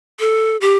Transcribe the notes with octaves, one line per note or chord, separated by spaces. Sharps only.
A4
G4